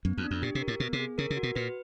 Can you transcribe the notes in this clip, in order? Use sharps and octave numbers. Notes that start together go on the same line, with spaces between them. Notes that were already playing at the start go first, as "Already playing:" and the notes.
F#2 B3
F2
D4
F2
A#2 G4
C3
A#4
A2
B2 B3
C3
G#4
C#3 A#4
C#3
F#4
B2
A#2 B4